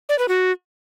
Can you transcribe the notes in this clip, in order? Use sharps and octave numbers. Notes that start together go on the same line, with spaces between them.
D5
B4
F#4